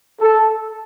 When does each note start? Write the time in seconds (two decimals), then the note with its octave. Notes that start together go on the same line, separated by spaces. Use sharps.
0.20 A4